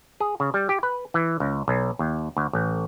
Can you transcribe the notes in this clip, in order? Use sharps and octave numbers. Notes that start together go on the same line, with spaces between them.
G#4
C#3
G3
G4
B4
E3
C#2
B1
D#2
D2
A1